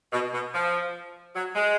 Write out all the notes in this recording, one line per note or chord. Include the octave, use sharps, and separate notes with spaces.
B2
B2
F3
F#3
G#3